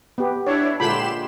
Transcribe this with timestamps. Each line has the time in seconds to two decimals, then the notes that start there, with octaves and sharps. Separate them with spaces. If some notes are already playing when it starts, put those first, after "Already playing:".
0.18 B3 G4
0.47 D4 E4 C#5
0.80 A#2 D3 G#3 G4 B5 C6 E7